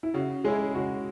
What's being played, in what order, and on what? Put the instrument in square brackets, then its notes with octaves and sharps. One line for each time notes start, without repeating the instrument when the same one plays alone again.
[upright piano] E4
[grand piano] C#3 [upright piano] F#4
[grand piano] G#3 C#4 E4 [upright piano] G#4
[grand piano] C#3 [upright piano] F#4